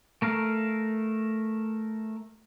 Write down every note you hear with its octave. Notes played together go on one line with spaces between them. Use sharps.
A3 A#4 F5